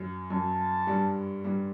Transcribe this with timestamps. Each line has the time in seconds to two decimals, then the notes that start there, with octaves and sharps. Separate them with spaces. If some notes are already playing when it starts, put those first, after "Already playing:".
Already playing: F#2 F#3
0.30 F#2 F#3 A5
0.87 G2 G3
1.44 G2 G3